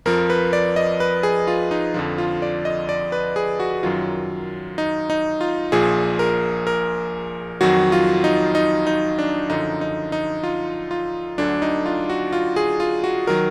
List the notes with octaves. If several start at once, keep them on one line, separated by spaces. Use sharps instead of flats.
F2 F3 A#4
B4
D5
D#5
B4
G#4
F4
D#4
F2 D3 F3
F4
D5
D#5
D5
B4
G#4
F#4
F#2 D#3 F#3 F4
D#4
D#4
F4
A#1 A#2 F3 G#4
A#4
A#4
F2 D#3 F#3 F#4
F4
D#4
D#4
D#4
D4
F#2 D3 F3 D#4
D#4
D#4
F4
F4
D2 D3 F#3 D4
D#4
F4
F#4
F4
G#4
F4
F#4
D#3 F#3 A#4